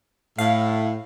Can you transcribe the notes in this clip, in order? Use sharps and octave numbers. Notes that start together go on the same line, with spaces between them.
A2 F5